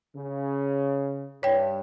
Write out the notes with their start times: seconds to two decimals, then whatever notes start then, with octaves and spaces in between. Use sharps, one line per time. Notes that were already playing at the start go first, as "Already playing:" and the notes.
0.16 C#3
1.43 G2 C#5 G5